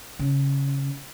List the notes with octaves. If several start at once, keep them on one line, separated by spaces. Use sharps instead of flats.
C#3